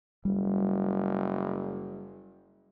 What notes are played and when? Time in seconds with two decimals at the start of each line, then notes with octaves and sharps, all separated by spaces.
0.25 F#1 G3